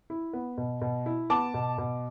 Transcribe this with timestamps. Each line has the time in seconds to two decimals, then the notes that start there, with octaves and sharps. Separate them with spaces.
0.10 E4
0.33 B3
0.58 B2
0.81 B2
1.06 E4
1.30 B3 A5 D6
1.54 B2
1.78 B2